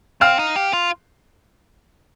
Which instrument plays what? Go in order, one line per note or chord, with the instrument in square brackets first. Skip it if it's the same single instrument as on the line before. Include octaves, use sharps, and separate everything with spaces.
[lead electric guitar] C4 [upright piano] F5 F6
[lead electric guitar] D#4
G4
F4